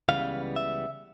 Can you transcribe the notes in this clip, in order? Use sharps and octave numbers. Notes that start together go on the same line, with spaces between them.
C#2 C#3 E3 G3 B3 F5
E5